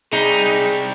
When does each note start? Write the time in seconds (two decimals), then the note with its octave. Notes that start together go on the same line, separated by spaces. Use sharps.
0.13 C3 G3 D#4 G#4